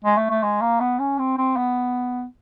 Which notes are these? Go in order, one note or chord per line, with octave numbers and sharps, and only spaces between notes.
G#3
A3
A3
G#3
A#3
B3
C#4
C4
C4
B3